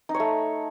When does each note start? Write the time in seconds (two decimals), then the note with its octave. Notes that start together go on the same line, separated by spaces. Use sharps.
0.09 D#4
0.14 C#5
0.20 A3